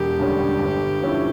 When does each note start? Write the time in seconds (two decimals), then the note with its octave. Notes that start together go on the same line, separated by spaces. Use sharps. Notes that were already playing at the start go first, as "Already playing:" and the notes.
Already playing: E1 G4
0.19 D2 D3 G3 C#4
0.59 G1
1.01 G2 F3 C#4 E4